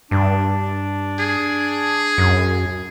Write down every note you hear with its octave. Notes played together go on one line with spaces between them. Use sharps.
G2 D4
G#4
F#2